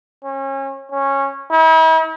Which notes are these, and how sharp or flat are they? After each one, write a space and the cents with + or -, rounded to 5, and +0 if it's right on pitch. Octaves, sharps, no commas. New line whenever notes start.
C#4 -30
C#4 -15
E4 -45